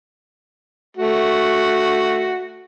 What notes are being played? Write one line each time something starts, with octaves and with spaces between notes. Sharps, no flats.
A3 F#4